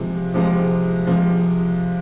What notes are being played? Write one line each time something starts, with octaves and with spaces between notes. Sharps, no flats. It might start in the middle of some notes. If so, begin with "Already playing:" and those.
Already playing: C3 F3 G#3
C3 F3 G#3
C3 F3 G#3